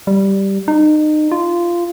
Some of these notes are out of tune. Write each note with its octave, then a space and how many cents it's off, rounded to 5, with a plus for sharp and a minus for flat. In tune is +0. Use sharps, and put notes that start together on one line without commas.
G3 -5
D#4 -30
F4 -15